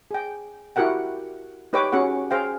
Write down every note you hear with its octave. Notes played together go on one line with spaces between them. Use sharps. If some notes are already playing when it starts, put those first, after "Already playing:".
G#4 G5
E4 F#4 G4 A#4 F#5 G5
D#4 G4 B4 C#5 G5 D6
C#4 F#4 G#4 F#5
G#4 C5 F5 G5